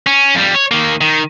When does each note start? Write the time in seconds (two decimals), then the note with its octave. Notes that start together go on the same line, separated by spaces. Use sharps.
0.07 C#4
0.35 F2 G3
0.54 C#5
0.71 D#3 A#3
1.01 D#3